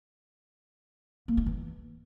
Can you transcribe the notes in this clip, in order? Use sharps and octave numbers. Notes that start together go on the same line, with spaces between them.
A#3
D#4
E3